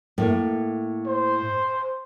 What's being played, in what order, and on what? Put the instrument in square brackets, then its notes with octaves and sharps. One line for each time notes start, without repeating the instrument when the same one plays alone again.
[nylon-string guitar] A2 A#3
[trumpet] C5